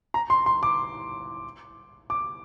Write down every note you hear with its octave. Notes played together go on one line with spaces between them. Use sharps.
A#5
C6
C6
D6
D6